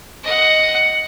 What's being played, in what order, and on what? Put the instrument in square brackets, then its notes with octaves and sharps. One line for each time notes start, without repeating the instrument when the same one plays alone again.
[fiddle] D#5 F#5